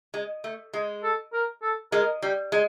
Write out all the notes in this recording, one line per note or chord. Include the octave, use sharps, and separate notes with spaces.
G#3
A3
G#3
A4
A#4
A4
G#3 A#4
G3
G#3